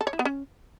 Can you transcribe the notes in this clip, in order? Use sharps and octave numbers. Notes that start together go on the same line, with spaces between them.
A4
C#5
E4
B3
C#4